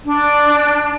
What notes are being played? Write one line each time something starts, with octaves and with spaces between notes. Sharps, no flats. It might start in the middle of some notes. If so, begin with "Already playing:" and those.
D4